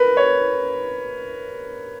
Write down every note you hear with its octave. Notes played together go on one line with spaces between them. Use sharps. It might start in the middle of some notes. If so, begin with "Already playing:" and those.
Already playing: A#4 B4
C#5